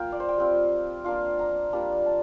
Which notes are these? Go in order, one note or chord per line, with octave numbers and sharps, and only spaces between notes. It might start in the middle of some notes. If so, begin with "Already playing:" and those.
Already playing: A#3 F4 F5 G5
D5
C5
G5
G3 C4 F4
A#3 D4 F4 F5
A#5
G3 A#3 D4 F4
A5